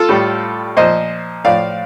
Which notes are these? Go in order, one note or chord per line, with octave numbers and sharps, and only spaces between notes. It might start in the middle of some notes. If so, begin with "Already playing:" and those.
Already playing: F4 A4
A2 G3
A#2 F3 C5 D#5
A2 F3 D5 F5